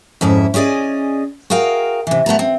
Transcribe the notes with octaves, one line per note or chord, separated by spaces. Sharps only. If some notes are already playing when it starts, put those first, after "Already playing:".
F2 G#2 C#4 E4
C#4 E4 G#4 D5 D#5
F#4 G#4 A#4 F5 G5
C3 E3
A3 B3 A5 A#5
C4